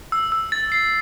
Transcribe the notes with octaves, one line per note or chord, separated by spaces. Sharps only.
E6
E6
A6
C7